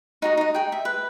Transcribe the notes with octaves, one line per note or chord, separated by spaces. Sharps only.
D#4 F#4 D#5
D#4 D#5
G#4 G5
E5
B4